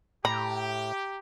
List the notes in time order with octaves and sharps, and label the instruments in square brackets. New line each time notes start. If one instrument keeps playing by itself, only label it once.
[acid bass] A2 [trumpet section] G4 [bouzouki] A#5 [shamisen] B5